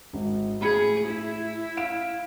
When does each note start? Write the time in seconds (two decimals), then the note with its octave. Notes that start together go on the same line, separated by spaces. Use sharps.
0.13 G#1
0.61 A2 G#4 B5 C#7
1.07 E4
1.77 F5 D7 E7